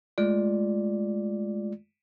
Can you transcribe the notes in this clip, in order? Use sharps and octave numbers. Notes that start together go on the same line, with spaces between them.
G#3 A3 F4 D5